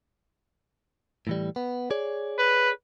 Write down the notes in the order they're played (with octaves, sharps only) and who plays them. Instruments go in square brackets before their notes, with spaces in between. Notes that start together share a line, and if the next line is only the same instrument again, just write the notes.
[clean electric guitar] A2 E3 G3
B3
G#4 C#5 D5
[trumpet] B4